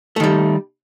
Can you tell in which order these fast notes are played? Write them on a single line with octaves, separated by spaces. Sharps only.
A3 D#3 G3